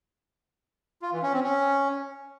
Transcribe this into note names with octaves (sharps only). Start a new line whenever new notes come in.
F4
E3
C#4
C4
C#4